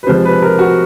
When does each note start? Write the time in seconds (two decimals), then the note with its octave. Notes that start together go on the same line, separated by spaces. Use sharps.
0.03 B4
0.07 C3 F3 G#3 C5
0.25 B4
0.42 A#4
0.59 F#4